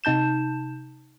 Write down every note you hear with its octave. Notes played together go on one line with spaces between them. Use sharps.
C3 D#4 A5 G6 E7